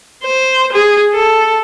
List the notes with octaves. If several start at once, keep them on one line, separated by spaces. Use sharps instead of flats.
C5
G#4
A4